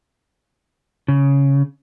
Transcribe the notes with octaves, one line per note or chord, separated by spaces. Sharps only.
C#3